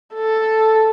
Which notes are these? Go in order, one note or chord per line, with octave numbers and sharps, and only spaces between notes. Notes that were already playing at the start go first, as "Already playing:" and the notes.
A4